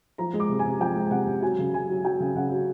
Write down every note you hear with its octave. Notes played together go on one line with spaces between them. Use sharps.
F3 A#5
G#3
D6
C3
G#5
C3
F3 G5
G#3
C3 F#5
C3
F#3 G#5
C#3
C#3 G#5
F#3
F#3 G5
C#3
C#3 F#5
F#3